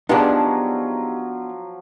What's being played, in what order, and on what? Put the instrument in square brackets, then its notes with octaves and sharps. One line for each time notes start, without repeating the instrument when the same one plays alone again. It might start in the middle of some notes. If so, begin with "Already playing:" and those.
[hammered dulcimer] F3 F#3 [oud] B3 D4 [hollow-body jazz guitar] D#4 G4 G#4